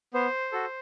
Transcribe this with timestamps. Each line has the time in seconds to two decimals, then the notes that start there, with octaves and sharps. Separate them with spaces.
0.14 B3 C5
0.52 F#4 A4